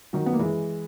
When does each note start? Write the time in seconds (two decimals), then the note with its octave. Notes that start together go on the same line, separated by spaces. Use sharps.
0.13 D#3 F#3
0.26 B3
0.33 A#3
0.39 E3 G#3